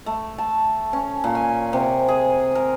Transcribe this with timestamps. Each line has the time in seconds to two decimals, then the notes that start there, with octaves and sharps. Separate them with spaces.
0.06 A3
0.38 A5
0.93 C#4
1.24 A#2
1.35 G#5
1.73 C3
2.08 G#4
2.55 A#4